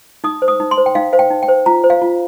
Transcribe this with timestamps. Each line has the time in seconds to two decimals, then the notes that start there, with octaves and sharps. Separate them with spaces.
0.24 D#4 D#6
0.42 C5
0.48 D#6
0.60 D#4
0.71 C6
0.78 C5
0.86 G5
0.95 D#4 F5
1.13 C5 F5
1.19 G5
1.31 D#4
1.43 G5
1.48 C5
1.66 F4 A#5
1.84 C5
1.90 F5
2.02 F4